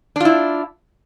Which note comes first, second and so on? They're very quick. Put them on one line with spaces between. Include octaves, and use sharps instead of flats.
D4 F4 E4